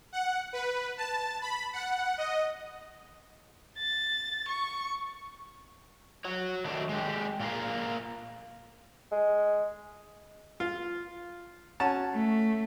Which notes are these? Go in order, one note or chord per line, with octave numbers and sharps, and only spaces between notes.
F#5
B4
A5
B5
F#5
D#5
A6
C#6
F#4 C#5
D#3 F#3 G3 A3 D4 F#4
G#3 G4
A#2 F4 G#4 A#4 F5
G#3
F4
C#4 F#4 A5
A3